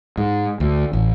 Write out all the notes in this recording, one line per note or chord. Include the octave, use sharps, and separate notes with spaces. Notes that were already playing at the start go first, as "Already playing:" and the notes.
G#2
D2
A1